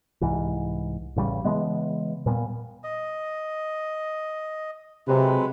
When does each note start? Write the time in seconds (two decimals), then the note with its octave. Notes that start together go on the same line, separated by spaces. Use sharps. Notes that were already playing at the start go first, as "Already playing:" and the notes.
0.21 C2 G#2 E3
1.16 A1 C#3 E3 G3
1.44 C#3 E3 G#3 B3
2.26 A#2 G3 A3 B3
2.84 D#5
5.08 C3 F#3 G#3 B4